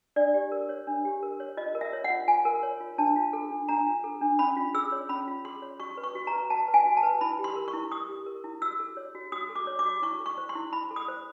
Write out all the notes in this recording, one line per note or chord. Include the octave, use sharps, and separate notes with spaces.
D4 D5
G4
A#4
C#5
D4
G4
A#4
C#5
F4 D#5
A#4
E5
C#5
F#5
F4
F4 G#5
A#4
C#5
F4
D4 A5
F4
A4
D4
D4 A#5
F4
A4
D4
C#4 B5
F4
G#4 E6
C#5
C#4 B5
F4
G#4 C6
C#5
F#4 C#6
B4
C#6
F#4
A#5
B4
F#4 A5
B4
G#5
F#4
A5
B4
E4 B5
G4
C6
A#4
C#6
E4
E4 D#6
G4
A#4
E4
F#4 E6
A4
C#5
F#4
F#4 D#6
A4
D6
C#5
D6
F#4
E4 C#6
A4
C#6
C5
C6
E4
E4 B5
A4
D#6
C5